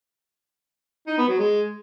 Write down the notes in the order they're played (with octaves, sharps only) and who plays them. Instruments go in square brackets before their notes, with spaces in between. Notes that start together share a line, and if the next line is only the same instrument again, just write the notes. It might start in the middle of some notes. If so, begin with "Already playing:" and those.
[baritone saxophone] D#4
B3
F#3
G#3